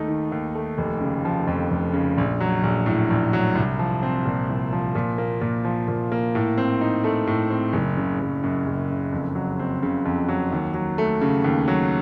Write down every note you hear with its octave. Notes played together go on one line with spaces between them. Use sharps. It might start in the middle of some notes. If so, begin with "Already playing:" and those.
Already playing: D#2 A3 D#4
D#3
D#2
A3
F1
C#3
F3
F2
F1
C#3
A#1
F#3
A#1
A2
A#1
F#3
C2
F3
C4
A#2
C2
F3
A#2
A#3
A#2
F3
A#2
A#3
A2
C4
D#4
A3
A2
C4
F#1
C#3
F#1
F#2
F#1
C#3
F2
F#3
C4
C#3
F2
F#3
D#2
F#3
A3
C#3
D#2
F#3